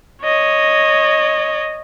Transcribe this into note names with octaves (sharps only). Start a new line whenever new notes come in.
C#5 D#5